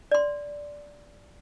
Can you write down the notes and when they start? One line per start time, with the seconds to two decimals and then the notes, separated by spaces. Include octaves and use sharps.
0.11 D5 C6